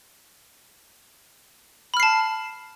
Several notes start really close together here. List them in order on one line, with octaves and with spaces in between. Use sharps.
B5 F6 C7 A5